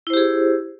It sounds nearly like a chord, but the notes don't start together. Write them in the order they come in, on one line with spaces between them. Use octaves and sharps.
E4 C5 G4 G#4